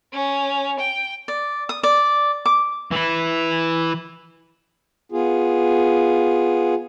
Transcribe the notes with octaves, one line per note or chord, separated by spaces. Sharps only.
C#4
G5
D5
D#6
D5
D6
E3 E4
B3 F4 G#4